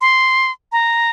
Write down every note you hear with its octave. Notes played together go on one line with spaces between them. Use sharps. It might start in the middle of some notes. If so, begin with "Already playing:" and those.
C6
A#5